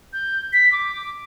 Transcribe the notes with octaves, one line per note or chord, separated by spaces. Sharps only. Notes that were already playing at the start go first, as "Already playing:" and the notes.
G6
B6
D6